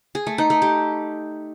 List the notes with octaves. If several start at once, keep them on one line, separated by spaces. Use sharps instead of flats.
G#4
A3
D#4
A3
G4